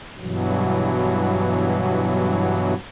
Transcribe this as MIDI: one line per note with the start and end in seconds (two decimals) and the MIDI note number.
0.18 2.74 43
0.18 2.74 47
0.18 2.74 52
0.18 2.74 54